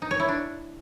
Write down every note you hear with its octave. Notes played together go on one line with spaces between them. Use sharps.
D#4
C#5
E4
D4